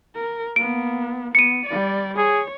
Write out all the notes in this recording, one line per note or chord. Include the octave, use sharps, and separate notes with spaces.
A#4
A#3 B3 D7
B3 C#7 D#7
G3 D5
G#4 C#5